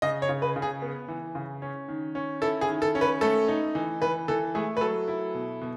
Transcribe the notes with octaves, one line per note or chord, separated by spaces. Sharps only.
C#3 D#5
C#5
C#3
B4
C#3
G#4
B3
E3
C#3
C#4
D#3
C#4
E4 A4
G#4
D#3
A4
C#4
B4
A3 A4
D#4
E3
E3 B4
E3 A4
A3 G#4
B4
F#3 A4
E4
B2
B2